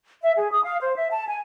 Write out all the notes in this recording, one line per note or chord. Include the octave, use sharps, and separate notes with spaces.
E5
G#4
D#6
F5
C5
E5
A5
G#5